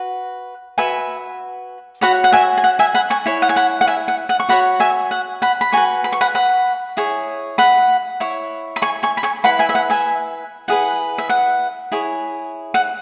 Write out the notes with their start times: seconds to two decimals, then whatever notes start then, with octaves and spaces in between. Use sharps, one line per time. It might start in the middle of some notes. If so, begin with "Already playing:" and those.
Already playing: F#4 B4
0.78 F#4 B4 E5 G#5
2.01 F#4 C#5 F#5 B5
2.24 F#5
2.32 E5 G#5
2.57 G#5
2.64 F#5
2.79 E5 G#5
2.95 F#5 B5
3.10 G#5 C#6
3.26 E4 C#5
3.42 F#5
3.49 G#5
3.56 F#5 B5
3.81 F#5
3.87 E5 G#5
4.08 F#5
4.29 F#5
4.40 C#6
4.49 F#4 C#5 F#5 B5
4.80 E5 G#5
5.11 F#5
5.42 F#5 B5
5.61 B5
5.72 F#4 B4 G#5 C#6
6.04 B5
6.12 C#6
6.21 F#5 B5
6.35 F#5 B5
6.97 E4 G#4 C#5
7.58 F#5 B5
8.20 E4 C#5
8.76 B5
8.82 G#5 C#6
9.03 G#5 C#6
9.17 B5
9.23 G#5 C#6
9.44 E4 B4 F#5 B5
9.59 E5 G#5
9.69 E5
9.75 F#5
9.90 E5 G#5
10.68 E4 G#4 B4 F#5
11.18 E5
11.29 F#5
11.92 E4 G#4 C#5
12.74 F#5